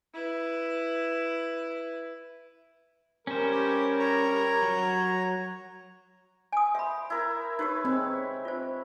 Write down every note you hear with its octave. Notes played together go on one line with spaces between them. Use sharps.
E4 B4
G3 C#4 A#4 C5
G4 C#5
C#5 A#5
F#3
G#5 D#6
C5 E5 B5
E4 A#4
D#4 G4 B4 C#5
G#3 C4 C#5 E5
F4 C5